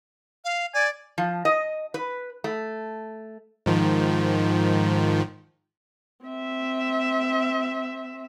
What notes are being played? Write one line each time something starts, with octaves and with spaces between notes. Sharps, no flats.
F5
D5 G#5
F3
D#5
B4
A3
G#2 D#3 F3
C4 E5